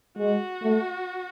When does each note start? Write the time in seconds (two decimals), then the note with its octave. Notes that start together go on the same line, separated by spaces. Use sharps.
0.18 G#3 F#4
0.62 A3